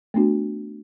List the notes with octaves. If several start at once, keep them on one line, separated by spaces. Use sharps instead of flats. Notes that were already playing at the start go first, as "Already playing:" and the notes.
A3 B3 D4 F#4